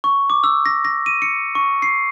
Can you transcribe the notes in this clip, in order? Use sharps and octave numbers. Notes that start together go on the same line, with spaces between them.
C#6
D6
E6
A#6
A#6
D#7
C#7
C#6
C7